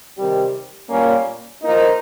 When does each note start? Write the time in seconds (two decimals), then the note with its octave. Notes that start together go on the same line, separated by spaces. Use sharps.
0.18 C3 D#3 G3
0.89 A#2 G3 A#3 C#4
1.62 A#2 F3 A#3 D#4